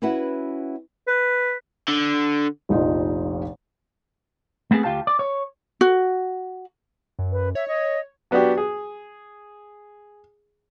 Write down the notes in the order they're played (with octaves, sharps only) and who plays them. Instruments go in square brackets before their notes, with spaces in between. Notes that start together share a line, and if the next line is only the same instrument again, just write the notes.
[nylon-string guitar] C#4 E4 F#4 B4 E5 F#5
[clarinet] B4
[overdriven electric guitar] D3
[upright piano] F1 A#1 D#4 F4
[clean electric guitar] A3 B3 C4 G#4 A4
D2 F4 G4 F5 A5
D5
C#5
[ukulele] F#4
[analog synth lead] F#2
[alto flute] B4
[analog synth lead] C#5 [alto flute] E5
[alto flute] D#5
[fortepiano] F#3 B3 D4 F#4 G4
G#4